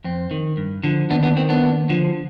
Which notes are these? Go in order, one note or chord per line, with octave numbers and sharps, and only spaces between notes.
F2 C4
D#3
G2
D3 F3
D#2 B3 D4
B3 D4
D#3 C4
B3 D4
D#2
D3 F3